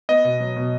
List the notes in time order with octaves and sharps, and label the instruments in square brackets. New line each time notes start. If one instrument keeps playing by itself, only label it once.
[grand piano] B3 [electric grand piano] D#5
[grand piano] B2
F#3
B2